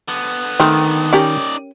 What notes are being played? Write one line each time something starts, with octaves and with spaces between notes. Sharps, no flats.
D3 B3
D#3 A3 C4
C#4 D#4 G4 A#4 D5